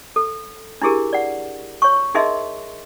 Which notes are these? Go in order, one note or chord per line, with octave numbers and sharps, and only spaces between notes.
A4
D4 E4 G4 G#4 A#4
D5 F#5
C#5 C#6
D#4 G#4 A#4 D#5 E5 C6